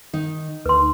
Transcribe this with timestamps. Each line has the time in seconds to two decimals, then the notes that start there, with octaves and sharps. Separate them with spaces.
0.13 D#3 D#4
0.66 D2 B4 C6